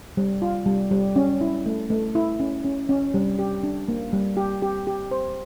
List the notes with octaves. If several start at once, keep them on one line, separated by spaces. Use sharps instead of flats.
G3
F4
G3
G3
C#4
E4
A3
A3
E4
C#4
C#4
C#4
G3
G4
D4
A#3
G3
G4
G4
G4
C5